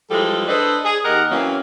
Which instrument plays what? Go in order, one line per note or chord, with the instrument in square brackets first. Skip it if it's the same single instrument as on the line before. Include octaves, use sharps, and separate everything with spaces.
[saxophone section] E3 F3 G3 G#3 A4
D4 A4 B4 C5 D5 D#5
G#4
D#2 G4 A#4 D#5 F#5
E3 F#3 A#3 C4 C#4